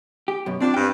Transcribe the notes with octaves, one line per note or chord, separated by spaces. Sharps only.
G4
F#2 B2
C4 D4 F4
G2 G3 C4 G5